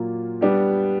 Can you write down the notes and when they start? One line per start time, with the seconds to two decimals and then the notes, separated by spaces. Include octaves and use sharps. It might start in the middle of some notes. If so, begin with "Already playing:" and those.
Already playing: A#2 F#3 A#3 F4
0.41 G3 B3 D4 G4